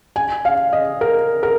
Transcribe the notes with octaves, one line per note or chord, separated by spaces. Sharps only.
G#5
F5
D#5
A#4
A#4